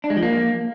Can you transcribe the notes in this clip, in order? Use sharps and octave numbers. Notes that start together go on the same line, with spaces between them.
D4
G#3
F3
A#3